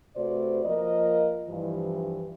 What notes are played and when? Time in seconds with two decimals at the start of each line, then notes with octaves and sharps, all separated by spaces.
0.15 C3 A3 F#4 B4 C5 D5
0.64 F3 A#3 F4 A#4 D#5
1.49 G2 E3 F3